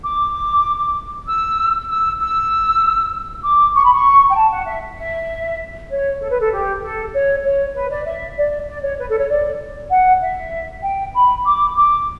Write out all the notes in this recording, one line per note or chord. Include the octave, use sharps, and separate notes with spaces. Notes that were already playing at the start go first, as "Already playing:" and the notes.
D6
E6
E6
E6
D6
C#6
B5
C#6
G5
A5
F#5
E5
E5
C#5
A4
B4
A4
G4
A4
C#5
C#5
B4
D5
E5
D5
D5
C#5
B4
A4
C#5
D5
F#5
E5
G5
B5
D6
D6